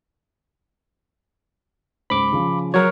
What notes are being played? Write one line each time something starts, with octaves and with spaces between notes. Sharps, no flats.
C#2 G#2 C5 B5 D6
C#3 F3
F#3 G#4 A#4 C#5